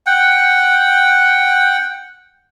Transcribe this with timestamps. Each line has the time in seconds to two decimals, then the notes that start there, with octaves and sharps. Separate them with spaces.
0.06 F#5 G5